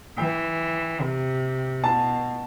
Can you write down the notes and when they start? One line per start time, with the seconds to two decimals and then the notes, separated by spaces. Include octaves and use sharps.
0.18 E3 G5
1.01 C3
1.84 B2 A5